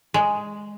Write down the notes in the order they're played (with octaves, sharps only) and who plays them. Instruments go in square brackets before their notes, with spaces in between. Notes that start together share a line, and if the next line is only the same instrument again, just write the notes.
[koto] G#3